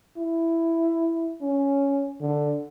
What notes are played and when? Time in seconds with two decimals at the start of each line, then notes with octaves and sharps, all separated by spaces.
0.17 E4
1.41 C#4
2.21 D3